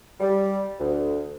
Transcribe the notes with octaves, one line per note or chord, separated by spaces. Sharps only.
G3
D2